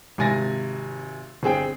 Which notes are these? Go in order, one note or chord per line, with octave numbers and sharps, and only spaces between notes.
G#1 C3 G#5 A6 A#6
G1 C4 G#4 G5